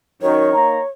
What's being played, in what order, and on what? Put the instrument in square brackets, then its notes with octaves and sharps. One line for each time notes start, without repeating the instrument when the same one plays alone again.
[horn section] F#2 D#3 [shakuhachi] C#5
[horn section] A#3 D#4 A#5